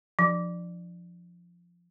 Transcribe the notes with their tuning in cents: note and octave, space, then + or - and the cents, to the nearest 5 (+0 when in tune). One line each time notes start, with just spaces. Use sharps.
F3 +0 D4 +35